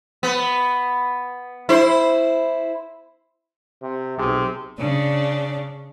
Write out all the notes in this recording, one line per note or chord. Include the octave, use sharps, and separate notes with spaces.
B3
E4 C5
C3
B1 C3 G#4
C#3 D4